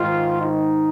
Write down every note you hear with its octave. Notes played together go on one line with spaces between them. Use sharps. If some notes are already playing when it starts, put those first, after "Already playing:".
Already playing: G#2 D#3 F4
D#4